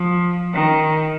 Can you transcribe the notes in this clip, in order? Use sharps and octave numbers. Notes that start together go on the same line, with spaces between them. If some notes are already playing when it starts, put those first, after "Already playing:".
Already playing: F3
D#3